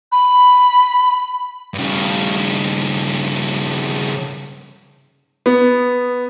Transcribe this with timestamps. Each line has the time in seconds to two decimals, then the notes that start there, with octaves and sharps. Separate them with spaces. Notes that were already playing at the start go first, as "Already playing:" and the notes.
0.12 B5
1.74 G2 C#3
5.46 B3